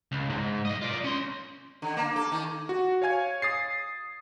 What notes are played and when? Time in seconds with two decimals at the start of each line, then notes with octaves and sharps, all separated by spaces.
0.12 C#2
0.30 G#2
0.65 B1 D#5
0.82 F4 D5
1.04 C#4 C6
1.82 D3
1.97 A#3
2.16 A4
2.32 D#3
2.69 F#4
3.02 C#5 F5 G#5 G#6
3.42 D#6 A6 C7